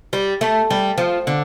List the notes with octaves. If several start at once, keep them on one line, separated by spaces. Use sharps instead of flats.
G3
A3
G3
F3
D3